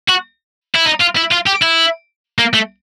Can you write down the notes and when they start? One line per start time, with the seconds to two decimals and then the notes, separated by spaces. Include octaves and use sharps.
0.08 F#4
0.75 E4
0.85 D#4
1.00 F4
1.16 E4
1.31 F4
1.46 G4
1.62 E4
2.39 A#3
2.54 A3